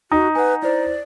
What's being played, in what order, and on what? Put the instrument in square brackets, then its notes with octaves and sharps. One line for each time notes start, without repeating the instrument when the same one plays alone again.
[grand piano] D#4 [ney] F#4
[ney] B4 [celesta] F#5 G#5
[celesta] E4 C5 [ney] D5